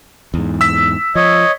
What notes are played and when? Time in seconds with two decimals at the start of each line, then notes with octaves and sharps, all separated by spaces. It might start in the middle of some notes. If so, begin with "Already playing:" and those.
0.34 E2 G#2
0.61 E6 B6
1.15 F3 C#5 D#5